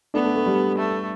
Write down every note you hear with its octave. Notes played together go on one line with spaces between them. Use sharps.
A3 B3 D4
A3
A3
G3
A3